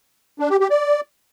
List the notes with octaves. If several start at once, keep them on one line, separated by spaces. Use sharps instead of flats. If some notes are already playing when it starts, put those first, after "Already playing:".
D4
G4
G4
D5